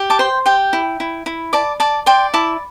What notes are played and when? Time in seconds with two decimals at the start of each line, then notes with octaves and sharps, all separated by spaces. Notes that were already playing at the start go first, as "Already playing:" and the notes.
Already playing: G4
0.10 A5 D6
0.19 C5 G5 C6
0.46 G4 G5
0.73 E4
1.00 E4
1.26 E4
1.53 D5 A5 D6
1.80 D5 A5 D6
2.06 D5 G5 C6
2.34 E4 A5 D6